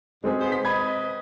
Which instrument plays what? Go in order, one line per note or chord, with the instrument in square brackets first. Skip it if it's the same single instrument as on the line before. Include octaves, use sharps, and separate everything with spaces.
[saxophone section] F#2 B2 [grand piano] G#3 C4 G#4
[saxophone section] G#2 B3 C5
[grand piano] B6
[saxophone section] C4 B4 D#5 [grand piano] B5 G#6